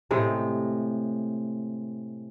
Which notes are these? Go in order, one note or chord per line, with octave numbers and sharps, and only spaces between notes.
A2 C3 G#3